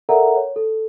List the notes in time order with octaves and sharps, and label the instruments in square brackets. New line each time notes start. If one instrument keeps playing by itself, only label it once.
[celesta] A4 A#4 D5 E5 F#5 A#5
C#5
A4